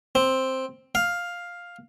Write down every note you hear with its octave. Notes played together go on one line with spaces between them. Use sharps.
C4
F5